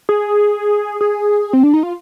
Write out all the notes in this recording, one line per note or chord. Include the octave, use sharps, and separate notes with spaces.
G#4
G#4
C4
D4
D#4
F4